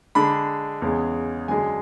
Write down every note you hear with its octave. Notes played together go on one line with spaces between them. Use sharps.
D3 G#3 D4 B5
E2 C#3 G#3
F#2 D3 G#3 D4 G#5